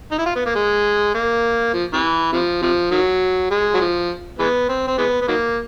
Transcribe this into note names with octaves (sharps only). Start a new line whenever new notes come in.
D#4
E4
F4
B3
A#3
G#3
A#3
F3
C3 E3
C3 F3
C3 F3
D#3 F#3
G#3
F#3
F3
E3 G#3 B3
C4
C4
E3 G#3 B3
B3
D#3 F#3 A#3